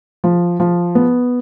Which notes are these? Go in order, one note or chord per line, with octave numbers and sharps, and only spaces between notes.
F3
F3
B3